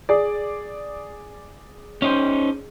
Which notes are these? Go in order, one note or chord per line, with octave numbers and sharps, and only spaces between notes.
G#4 D5
C#4 D#4 C5